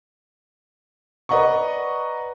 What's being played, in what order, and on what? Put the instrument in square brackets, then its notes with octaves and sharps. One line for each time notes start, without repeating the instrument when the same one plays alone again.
[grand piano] B4 D5 D#5 F#5 A#5 C#6